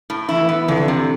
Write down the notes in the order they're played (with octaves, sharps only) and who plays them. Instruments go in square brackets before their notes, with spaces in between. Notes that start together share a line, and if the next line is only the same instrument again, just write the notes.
[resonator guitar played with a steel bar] A2
[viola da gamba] E3 [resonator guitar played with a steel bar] E4
[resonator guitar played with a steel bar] B3
[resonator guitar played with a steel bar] F2 [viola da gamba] D3
[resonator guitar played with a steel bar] C3